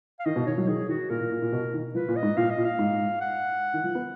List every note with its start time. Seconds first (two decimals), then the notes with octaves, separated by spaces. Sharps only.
0.20 F5
0.26 D#3 D#5
0.36 B2
0.47 D#3 C#5
0.58 F#3
0.68 D#3 G#4
0.89 D#3 F#4
1.10 A#2 A#4
1.21 A#2
1.32 A#2
1.42 A#2
1.52 B2
1.74 D#3
1.95 F3 B4
2.08 A#2
2.16 D#5
2.23 G#2
2.37 A#2 F5
2.50 D#5
2.58 A#2
2.65 F5
2.79 G#2
3.21 F#5
3.74 D#3
3.84 F3
3.95 B3